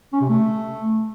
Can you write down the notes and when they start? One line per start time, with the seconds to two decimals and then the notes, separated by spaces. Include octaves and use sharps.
0.13 C#4
0.21 C3
0.29 A3